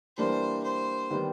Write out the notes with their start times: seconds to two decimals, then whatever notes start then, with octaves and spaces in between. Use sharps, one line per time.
0.17 E3 G3 A#3 D4 C5
0.64 C5
1.10 D#3 G3 B3